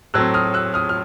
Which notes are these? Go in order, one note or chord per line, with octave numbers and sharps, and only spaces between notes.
A2 F#3 A3 C4 E6 F#6
D#6 F6
E6 F#6
D#6 F6
F6